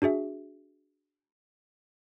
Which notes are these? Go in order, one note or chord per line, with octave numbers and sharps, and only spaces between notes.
D4 F#4 G#4 E5